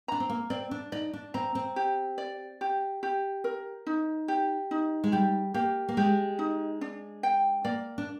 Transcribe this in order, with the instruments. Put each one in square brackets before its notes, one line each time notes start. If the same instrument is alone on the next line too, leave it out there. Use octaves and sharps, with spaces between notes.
[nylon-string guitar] D4 [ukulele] A#5
[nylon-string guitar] C4
A#3
[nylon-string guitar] C4 [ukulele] D5
[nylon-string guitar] D4
[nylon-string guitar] D#4 [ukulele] D5
[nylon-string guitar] D4
[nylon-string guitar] C4 [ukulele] A#5
[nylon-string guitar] C4
[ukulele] G4
D5
G4
G4
A#4
D#4
G4
D#4
[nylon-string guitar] G#3
[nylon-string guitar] G3 [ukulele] G4
[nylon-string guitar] A#3 [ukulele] G4
[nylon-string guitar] A#3
[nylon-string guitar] G#3 [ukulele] G4
[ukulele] D#4
D4
G5
[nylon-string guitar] A#3 [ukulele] D5
[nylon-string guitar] D4